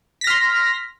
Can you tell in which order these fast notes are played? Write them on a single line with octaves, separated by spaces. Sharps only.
B6 A#6 F6 C6